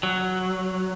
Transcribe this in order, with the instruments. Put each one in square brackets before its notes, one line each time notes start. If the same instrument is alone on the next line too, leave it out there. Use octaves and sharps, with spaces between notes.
[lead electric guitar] F#3